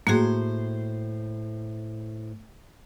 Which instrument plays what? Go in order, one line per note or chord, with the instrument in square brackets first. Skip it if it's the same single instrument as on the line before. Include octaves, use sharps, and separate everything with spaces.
[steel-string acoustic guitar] A2 C5 [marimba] A#3 F#4 G#4